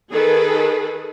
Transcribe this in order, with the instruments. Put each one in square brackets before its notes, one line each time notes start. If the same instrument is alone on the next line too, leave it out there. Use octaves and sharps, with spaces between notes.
[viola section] D#3 G#4 A4 B4